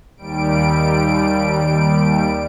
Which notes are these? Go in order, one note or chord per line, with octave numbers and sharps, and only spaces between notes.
D#2 G3 D7